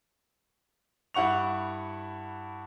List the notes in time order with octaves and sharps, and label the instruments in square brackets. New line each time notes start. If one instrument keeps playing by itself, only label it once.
[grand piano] G2 E4 F#5 C#6 F7